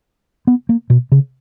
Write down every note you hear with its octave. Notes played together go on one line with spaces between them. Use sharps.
B3
A#3
B2
C#3